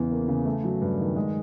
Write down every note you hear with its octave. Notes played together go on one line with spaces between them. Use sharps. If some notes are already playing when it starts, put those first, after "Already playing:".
Already playing: E2 C#3 E3
A#3
C#3
A3
F#3
G2
D#3
G#3